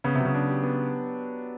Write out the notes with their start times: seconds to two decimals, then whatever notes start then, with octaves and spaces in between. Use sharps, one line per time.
0.04 C#3 B3
0.15 C3
0.20 F#3
0.25 C#3
0.35 D4
0.49 G4
0.63 B3